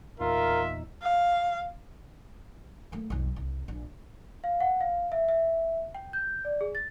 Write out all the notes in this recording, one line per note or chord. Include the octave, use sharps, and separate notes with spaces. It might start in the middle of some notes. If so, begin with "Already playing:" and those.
E2 A#2 D#4 F4 A#4 E5
F5
A3 A#3
B1 F2
C2
A#1
F5
F#5
F5
E5
E5
G5
G6
D5
G#4
A6